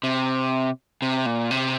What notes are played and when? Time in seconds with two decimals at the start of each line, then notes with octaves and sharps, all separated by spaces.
0.03 C3
1.02 C3
1.26 A#2
1.51 C3